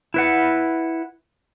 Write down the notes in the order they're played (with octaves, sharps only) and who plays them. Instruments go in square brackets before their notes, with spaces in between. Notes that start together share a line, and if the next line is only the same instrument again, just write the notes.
[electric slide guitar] E4 B4 F#5